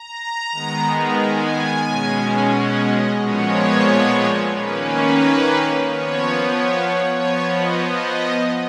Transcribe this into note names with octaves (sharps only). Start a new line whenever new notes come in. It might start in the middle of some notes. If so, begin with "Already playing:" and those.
Already playing: A#5
D#3 G#3 B3
G#5
B2 G#3 C#4
F#5
D#5
A#2 F3 G#3 B3 C#5
D#3 A#3 C#4 B4
B4
B3 C#5
F3
C#5
C#5
F3 B3 C#5
D#5
D#5